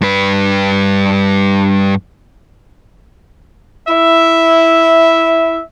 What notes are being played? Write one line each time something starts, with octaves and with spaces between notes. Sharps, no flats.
G2 B4
E4 E5